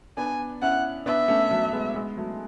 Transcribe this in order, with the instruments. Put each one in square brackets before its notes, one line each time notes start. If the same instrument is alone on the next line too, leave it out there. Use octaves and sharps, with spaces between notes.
[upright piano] B3 D4 [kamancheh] G#5
[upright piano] C#4 E4 [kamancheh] F#5
[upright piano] B3 D4 [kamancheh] E5
[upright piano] A3 C#4
F#3 A3
G#3 B3
G#3 B3
F#3 A3